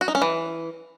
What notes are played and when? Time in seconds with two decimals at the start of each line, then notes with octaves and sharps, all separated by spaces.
0.01 F#4
0.08 D#4
0.15 C#4
0.22 E3